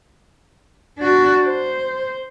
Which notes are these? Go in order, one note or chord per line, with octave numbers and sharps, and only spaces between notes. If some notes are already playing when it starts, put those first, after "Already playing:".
D4 F#4
C5